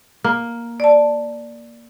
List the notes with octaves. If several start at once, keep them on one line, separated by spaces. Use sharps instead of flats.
A#3
D5 A5